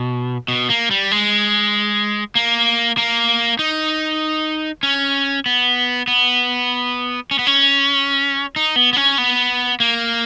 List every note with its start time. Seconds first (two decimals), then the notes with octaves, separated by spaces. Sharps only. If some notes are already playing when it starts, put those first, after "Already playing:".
Already playing: B2
0.48 B2
0.70 A#3
0.91 G3
1.11 G#3
2.35 A#3
2.97 A#3
3.59 D#4
4.83 C#4
5.46 B3
6.08 B3
7.31 C#4
7.39 B3
7.47 C#4
8.56 D#4
8.76 B3
8.93 B3
8.97 C#4
9.18 B3
9.80 A#3